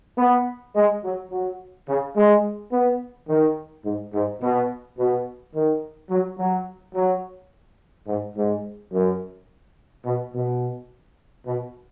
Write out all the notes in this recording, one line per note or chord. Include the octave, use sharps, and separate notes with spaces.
B3
G#3
F#3
F#3
C#3
G#3
B3
D#3
G#2
G#2
B2
B2
D#3
F#3
F#3
F#3
G#2
G#2
F#2
B2
B2
B2